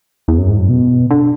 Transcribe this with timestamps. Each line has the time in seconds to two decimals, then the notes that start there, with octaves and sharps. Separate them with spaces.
0.28 E2
0.38 F#2
0.49 G#2
0.59 F#2
0.69 B2
1.11 D3